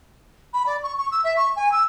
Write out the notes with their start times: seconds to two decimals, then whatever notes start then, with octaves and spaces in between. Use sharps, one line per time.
0.54 B5
0.66 D5
0.83 C#6
0.98 C#6
1.11 E6
1.24 E5
1.37 C#6
1.56 G#5
1.72 E6